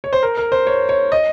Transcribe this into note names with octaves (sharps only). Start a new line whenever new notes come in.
C#5
C5
A#4
A#4
C5
C#5
C#5
D#5